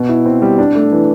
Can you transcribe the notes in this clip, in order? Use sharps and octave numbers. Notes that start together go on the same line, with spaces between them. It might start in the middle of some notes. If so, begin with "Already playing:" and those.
Already playing: B2
E4
C4
G3
D4
A3
E3